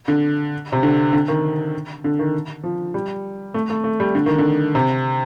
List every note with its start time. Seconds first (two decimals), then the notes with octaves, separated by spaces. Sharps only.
0.08 D3
0.72 C3
0.83 D3
1.13 D3
1.28 D#3
2.04 D3
2.19 D#3
2.63 F3
2.94 G3
3.54 A3
3.70 A3
3.84 A3
4.00 G3
4.15 D3
4.26 D#3
4.38 D3
4.75 C3